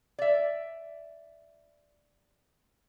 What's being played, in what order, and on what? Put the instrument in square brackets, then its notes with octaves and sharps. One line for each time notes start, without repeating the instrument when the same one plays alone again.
[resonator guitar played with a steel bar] D5 E5